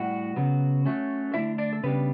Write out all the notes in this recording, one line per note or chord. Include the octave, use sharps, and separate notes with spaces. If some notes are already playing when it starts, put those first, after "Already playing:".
Already playing: A2 G3 E4 F#4 F#5
C#3 F#3 B3
F#3 A3 C#4
D3 A3 D4 E4 E5
D4 D5
A4
C#3 G3 B3 D4 B4